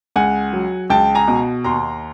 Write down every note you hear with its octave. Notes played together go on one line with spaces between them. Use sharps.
C#2 F#5 G#5
F#3
C#2 G5 A5
G#5 A#5
B2
D#2 A#5 C6